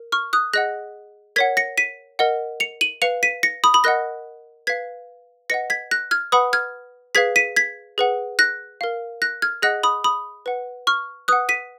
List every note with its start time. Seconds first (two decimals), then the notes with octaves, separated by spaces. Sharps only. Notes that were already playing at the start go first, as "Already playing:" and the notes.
Already playing: A#4
0.12 C#6 F6
0.33 D#6 F#6
0.53 G#4 D#5 F#5 F#6 A#6
1.36 A#4 C#5 F#5 G#6 B6
1.57 A#6 C#7
1.78 B6 D#7
2.19 A#4 D#5 F#5
2.60 C#7 F7
2.81 D#7 F#7
3.02 B4 F5 C#7 F7
3.23 B6 D#7
3.43 A#6 C#7
3.64 B5 D#6
3.74 B5 D#6
3.84 A#4 D#5 F#5 F#6 A#6
4.67 B4 F5 G#6 B6
5.50 B4 D#5 F#5 A#6 C#7
5.70 G#6 B6
5.91 F#6 A#6
6.11 F6 G#6
6.32 B4 F#5 B5 D#6
6.53 F6 G#6
7.15 G#4 B4 F5 G#6 B6
7.36 B6 D#7
7.56 G#6 B6
7.98 G#4 B4 F#5
8.39 F#6 A#6
8.81 A#4 F5
9.22 F#6 A#6
9.42 F6 G#6
9.62 G#4 D#5 F#5 F#6 A#6
9.83 B5 D#6
10.04 B5 D#6
10.46 B4 F#5
10.87 C#6 F6
11.28 B4 F#5 D#6 F#6
11.49 B6 D#7